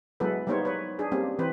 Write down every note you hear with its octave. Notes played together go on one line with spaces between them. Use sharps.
F#3 G#3 B3 E4 A4 B4
G3 A#3 B3 D#4 C5 C#5
B4 C#5
D4 G#4
G3 A#3 C4 C#4 G4
E3 C4 B4 C5